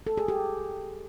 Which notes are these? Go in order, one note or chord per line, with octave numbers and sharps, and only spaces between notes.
A4
G#4
G4